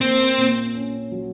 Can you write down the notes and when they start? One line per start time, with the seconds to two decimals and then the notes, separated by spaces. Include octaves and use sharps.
0.01 A#3 C4
0.38 A#2
0.75 C#4
1.12 F#3